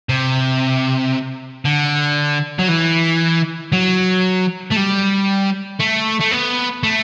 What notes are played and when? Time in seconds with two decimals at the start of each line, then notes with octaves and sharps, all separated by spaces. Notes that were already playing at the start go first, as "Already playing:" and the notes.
0.09 C3
1.65 D3
2.59 F#3
2.68 E3
3.72 F#3
4.71 A3
4.76 G3
5.80 A3
6.21 A3
6.32 B3
6.83 A3